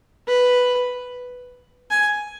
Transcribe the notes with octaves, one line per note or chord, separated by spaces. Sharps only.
B4
G#5